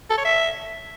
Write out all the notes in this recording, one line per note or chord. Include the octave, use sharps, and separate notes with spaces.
A4
C#5
E5